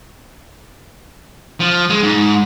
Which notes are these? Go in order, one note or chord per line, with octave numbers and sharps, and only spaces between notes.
F3
G#3
G#2